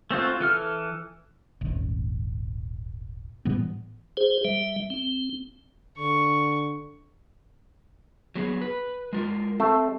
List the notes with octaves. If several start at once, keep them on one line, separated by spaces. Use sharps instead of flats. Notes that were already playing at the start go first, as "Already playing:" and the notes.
A3 C4 F4 F#4
E3 A4 F6
D#1 G#1
A2 E3 G3 B3
G#4 C5
G3 E5
C4
D3 C#6
F#3 B3 G#4
B4
G#3 F4 A#4
A3 C4